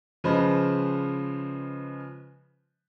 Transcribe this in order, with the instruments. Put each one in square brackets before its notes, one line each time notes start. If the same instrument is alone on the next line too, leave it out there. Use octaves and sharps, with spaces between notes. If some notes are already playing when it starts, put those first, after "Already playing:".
[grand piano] C#3 F3 G#3 B4 C5